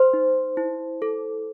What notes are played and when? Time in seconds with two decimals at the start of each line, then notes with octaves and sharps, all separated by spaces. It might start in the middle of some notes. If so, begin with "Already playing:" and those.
Already playing: C5 C6
0.13 D#4
0.57 E4
1.02 A4